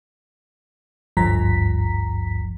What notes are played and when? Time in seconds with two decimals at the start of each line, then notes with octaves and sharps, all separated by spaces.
1.17 G#1 D2 G2 F3 A#5 B6